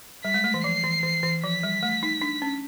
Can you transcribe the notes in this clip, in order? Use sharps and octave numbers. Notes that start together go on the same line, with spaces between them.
G3 B6
G#3
A3
E3
F3 C7
E3
E3
E3
F3 B6
G3
A3
D#4
D4
C#4